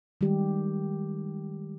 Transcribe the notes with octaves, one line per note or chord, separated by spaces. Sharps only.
D#3 G3 G#3 G4